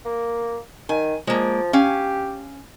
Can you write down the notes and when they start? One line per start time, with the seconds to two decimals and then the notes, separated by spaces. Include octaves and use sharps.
0.05 A#3
0.89 D#3 G#5
1.27 F3 G#3 A#3
1.73 C#4 G4 F5 G#5